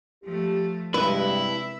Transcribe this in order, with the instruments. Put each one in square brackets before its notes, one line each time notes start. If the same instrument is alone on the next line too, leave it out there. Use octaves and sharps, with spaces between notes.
[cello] F3 A3 [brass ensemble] G4
[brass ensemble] G2 [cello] C3 G#3 [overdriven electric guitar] E4 [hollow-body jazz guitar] B4
[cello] E5